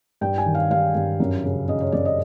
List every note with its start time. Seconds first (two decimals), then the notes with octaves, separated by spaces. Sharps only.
0.21 G2 G5
0.38 G#5
0.46 D#3
0.55 F5
0.70 G2 F5
0.95 G2
1.20 F#2
1.44 C#3
1.68 C#3 D#5
1.80 C#5
1.92 F#2 D5
2.05 D#5